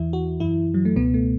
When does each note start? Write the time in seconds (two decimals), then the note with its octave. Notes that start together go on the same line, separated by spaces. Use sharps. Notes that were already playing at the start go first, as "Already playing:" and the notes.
Already playing: E2 E3 E4
0.13 F#4
0.40 F#2 E3 E4
0.74 F#3
0.85 A3
0.96 C#2 B2 B3
1.14 A3